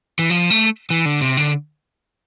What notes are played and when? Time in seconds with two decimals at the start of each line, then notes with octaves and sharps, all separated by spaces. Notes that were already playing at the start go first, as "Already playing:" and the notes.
0.19 E3
0.30 F3
0.50 A3
0.90 E3
1.05 D3
1.21 C3
1.37 D3